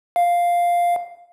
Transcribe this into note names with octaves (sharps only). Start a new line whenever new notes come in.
F5